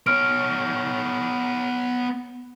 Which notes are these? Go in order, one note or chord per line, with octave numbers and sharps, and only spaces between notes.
B3 C#5 F6 D7